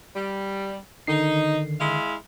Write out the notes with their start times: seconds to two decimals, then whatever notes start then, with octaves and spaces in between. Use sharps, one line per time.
0.15 G3
1.07 D3 D#3 D#4 C7
1.80 G#3 E4 F5